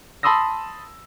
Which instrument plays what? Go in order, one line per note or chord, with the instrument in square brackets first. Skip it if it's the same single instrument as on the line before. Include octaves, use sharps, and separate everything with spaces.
[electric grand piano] A5 B5 C6 D#6 E6 A#6